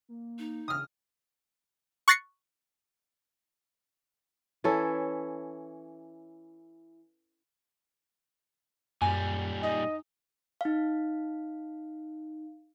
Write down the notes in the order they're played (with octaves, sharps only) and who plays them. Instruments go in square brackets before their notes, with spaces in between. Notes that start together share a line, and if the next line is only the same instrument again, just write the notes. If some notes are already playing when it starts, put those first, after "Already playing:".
[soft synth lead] A#3
[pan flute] D#4
[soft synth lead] C#3 [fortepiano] D#6 F6
[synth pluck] C#6 F#6 A6 A#6 C7 C#7
[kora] E3 C#4 E4 A4
[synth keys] F#2 [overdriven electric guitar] A#2 G3 [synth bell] G#5
[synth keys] D#4 [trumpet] D#5
[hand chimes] D#4 F5